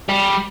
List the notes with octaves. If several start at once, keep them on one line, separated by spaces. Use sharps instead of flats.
G3